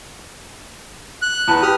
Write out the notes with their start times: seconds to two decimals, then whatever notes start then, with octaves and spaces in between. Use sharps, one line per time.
1.22 F#6
1.48 E2 B4 A5
1.63 G4 B4 D#6 F6